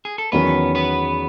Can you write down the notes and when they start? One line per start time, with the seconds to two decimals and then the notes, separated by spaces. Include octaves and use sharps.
0.05 G#4
0.18 A4
0.32 E2 D#3 F#3 B3 C#4 B4
0.75 B3 B4